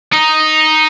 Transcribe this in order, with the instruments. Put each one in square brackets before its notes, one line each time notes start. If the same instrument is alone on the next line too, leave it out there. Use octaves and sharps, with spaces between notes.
[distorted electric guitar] D#4